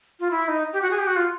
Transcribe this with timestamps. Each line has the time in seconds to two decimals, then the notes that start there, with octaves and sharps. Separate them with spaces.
0.20 F4
0.31 E4
0.48 D#4
0.73 G4
0.82 F#4
0.91 G#4
0.99 G4
1.07 F#4
1.16 F4